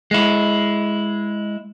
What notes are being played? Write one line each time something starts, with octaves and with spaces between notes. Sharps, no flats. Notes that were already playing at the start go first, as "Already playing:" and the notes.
G#3 E4